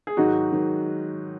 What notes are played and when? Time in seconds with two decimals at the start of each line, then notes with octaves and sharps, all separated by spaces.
0.07 G#4
0.17 G#2 D#3 F#3 D#4 F#4
0.52 D#3 F#3